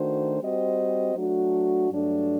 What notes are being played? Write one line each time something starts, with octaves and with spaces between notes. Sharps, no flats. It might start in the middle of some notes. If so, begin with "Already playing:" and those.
Already playing: D#3 A3 D4 F#4 C5
G3 C4 F#4 C5 D#5
F#3 A3 D4 F#4
G2 F#3 A3 D4